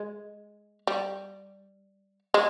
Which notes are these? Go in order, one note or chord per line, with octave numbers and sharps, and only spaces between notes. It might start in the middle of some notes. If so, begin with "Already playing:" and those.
Already playing: G#3
G3
G#3